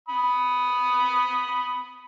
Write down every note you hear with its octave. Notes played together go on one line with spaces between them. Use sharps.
B5 D#6